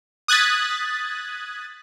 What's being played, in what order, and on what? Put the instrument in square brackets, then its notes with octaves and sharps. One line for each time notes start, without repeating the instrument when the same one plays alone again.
[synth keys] D#6 F#6 G#6 A6 B6